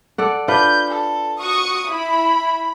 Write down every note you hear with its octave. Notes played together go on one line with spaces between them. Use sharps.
A4 D5 F#5
D4 F4 B4 G6
A4
F#4 C#6 D#6
E4 B5